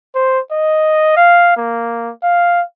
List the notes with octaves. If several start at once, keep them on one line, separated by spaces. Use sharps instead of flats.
C5
D#5
F5
A#3
F5